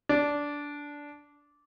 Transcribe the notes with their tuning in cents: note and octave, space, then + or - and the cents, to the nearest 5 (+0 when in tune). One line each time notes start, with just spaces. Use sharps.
D4 -15